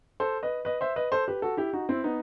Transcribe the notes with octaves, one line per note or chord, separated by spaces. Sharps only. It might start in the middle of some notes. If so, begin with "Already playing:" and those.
A4 C5
B4 D#5
B4 D#5
C5 E5
B4 D#5
A4 C5
G4 B4
F#4 A4
E4 G4
D#4 F#4
C4 E4
B3 D#4